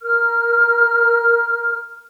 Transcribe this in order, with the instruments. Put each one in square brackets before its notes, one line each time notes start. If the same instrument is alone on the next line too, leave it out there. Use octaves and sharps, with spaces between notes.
[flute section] A#4 F6